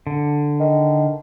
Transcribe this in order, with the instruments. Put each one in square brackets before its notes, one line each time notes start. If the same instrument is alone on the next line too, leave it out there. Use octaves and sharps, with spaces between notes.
[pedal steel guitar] D3
[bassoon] D#3